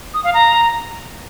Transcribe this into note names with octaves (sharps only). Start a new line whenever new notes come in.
D#6
F5
A#5